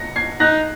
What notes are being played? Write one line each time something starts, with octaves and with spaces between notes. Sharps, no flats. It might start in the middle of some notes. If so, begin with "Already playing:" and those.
Already playing: A#6 C#7
G#6 C7
D#4 F#6 A#6